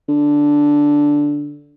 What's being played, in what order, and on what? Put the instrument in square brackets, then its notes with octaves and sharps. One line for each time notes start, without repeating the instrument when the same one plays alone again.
[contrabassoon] D3